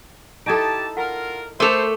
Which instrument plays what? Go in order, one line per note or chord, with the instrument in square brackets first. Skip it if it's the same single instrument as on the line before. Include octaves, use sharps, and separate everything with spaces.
[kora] D#4 E4 A4 [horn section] G4 A5 [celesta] D#6 G#6 D7
[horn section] F4 A#4 [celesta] F#5
[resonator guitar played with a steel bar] A3 A4 [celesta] A#4 D6 F7 [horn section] C5